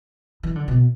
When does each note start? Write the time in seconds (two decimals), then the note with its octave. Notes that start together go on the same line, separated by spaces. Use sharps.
0.43 E3
0.55 D3
0.68 B2